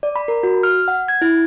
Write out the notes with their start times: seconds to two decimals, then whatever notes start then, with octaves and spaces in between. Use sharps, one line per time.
0.03 D5
0.16 B5
0.28 A#4
0.43 F#4
0.63 F6
0.88 F#5
1.08 G#6
1.22 E4